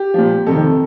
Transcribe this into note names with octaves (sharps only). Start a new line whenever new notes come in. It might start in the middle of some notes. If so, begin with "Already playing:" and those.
Already playing: G4
A#2 F3
F2 C3 D#3 A4